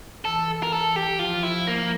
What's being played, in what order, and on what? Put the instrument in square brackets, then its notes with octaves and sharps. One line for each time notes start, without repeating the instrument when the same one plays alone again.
[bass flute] E3 [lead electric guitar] A4
[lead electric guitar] A#4
A4
G4
[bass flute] F3 [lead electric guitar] F4
[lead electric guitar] E4
A#3